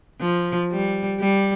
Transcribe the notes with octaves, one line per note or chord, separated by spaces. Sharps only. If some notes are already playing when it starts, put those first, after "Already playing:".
F3
G3
G3